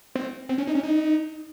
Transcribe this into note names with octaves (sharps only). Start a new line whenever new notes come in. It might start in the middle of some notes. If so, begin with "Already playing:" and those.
C4
C4
C#4
D#4
C#4
D#4